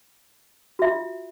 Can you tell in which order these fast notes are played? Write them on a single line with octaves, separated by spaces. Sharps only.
F#4 E5 F4